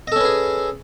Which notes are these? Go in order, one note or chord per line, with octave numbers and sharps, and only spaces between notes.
C#4 G#4 A4 B4 D#5